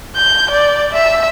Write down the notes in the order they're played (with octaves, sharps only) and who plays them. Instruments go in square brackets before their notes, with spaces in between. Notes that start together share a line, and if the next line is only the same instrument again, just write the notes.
[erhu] G6
D5
E5